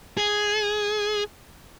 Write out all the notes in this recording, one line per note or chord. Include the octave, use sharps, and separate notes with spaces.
G#4